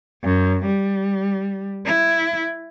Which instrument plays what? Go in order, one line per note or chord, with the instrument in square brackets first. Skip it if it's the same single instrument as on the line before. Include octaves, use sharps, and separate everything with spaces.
[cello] F#2
G3
E4